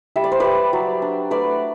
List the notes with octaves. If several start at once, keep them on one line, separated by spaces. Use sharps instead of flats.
G3 E5
D5
C5
G3 B4 D5
F#3
D4
A3 B4 D5